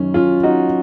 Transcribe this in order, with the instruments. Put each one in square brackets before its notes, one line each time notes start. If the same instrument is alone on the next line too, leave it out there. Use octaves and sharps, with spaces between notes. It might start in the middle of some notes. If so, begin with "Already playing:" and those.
Already playing: [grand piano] F#2 D#3 [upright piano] C#4
[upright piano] C#4 F4
D#4 F#4